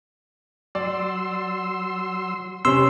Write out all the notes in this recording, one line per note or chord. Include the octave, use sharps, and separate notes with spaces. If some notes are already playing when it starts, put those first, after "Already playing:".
F#3 D5 C6 E6
C3 C#4 G4 B4 C6 E6